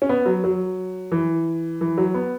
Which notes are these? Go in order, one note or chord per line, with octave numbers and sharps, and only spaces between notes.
C#4
B3
F#3
F#3
E3
E3
F#3
B3